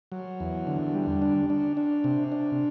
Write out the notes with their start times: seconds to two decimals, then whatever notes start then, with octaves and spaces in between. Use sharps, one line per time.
0.12 F#3
0.40 E2
0.67 D3
0.94 G3
1.22 D4
1.50 D4
1.77 D4
2.04 C3
2.32 D4